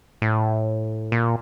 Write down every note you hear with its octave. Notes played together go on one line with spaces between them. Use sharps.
A2
A#2